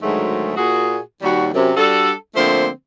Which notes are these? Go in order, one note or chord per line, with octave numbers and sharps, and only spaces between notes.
D2 G#2 D#3 F#3 G#3 A3
A#2 F#4 G#4
D#2 G3 F#4
F#2 C3
G3 D4 F#4 A4
D3 F3 A3 A#3 C4 C5